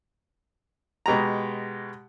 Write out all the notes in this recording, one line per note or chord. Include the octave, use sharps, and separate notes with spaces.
B2 G#3 G4 A#5